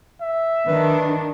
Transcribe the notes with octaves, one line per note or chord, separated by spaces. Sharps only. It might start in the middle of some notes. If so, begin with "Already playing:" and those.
E5
D#3 D4 B4